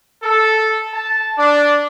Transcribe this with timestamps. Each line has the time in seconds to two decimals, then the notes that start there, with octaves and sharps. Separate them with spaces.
0.21 A4
0.91 A5
1.36 D4